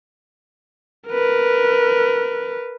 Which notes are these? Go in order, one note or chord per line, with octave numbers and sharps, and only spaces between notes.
A#4 B4